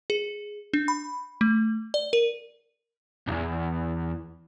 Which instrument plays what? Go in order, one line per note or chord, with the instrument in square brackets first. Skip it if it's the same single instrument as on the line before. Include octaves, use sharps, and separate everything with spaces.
[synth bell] G#4
D4
B5
A3
D5
A#4
[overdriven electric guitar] B1 E2